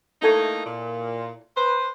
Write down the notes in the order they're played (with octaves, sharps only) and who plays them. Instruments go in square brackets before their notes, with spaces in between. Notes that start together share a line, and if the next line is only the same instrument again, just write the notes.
[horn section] A3 A#3 D#4 [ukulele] E4 A4 C#5
[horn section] A#2
B4 C5